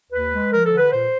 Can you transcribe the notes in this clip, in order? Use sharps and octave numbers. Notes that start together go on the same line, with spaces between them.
D#2 B4
G#3
F3 A#4
A4
D3
B4
A#2 C5